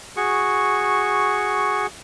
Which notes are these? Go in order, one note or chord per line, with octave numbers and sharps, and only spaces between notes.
F#4 G#4 C#6